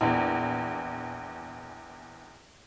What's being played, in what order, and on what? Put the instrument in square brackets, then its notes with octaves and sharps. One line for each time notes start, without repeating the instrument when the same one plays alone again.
[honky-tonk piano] A#1 E2